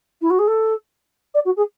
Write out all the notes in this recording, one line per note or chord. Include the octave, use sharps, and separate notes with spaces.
E4
F#4
G#4
A4
D5
F#4
G#4